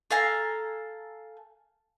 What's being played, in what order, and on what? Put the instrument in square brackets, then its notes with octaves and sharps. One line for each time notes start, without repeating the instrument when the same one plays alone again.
[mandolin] A4 F5 G#5 A#5